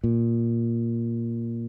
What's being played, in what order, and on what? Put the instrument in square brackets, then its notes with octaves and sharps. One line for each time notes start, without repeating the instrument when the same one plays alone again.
[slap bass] A#2